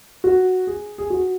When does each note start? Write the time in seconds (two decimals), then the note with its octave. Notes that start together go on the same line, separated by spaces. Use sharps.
0.24 F#4
0.67 G#4
0.98 G#4
1.10 F#4